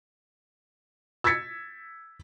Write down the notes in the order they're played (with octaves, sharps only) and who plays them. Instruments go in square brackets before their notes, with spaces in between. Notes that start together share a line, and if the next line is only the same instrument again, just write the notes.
[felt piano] E6 G#6 A6 B6 C#7